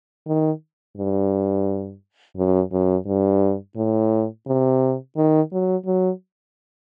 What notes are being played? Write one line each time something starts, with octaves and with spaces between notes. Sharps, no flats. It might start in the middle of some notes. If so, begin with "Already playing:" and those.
D#3
G2
F#2
F#2
G2
A2
C3
D#3
F#3
F#3